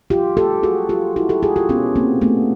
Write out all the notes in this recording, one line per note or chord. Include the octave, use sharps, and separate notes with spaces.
F4 G4
G4 A4
F#4 G#4
F4 G4
E4 F#4
G4 A4
F#4 G#4
F4 G4
B3 C#4
A#3 C4
A3 B3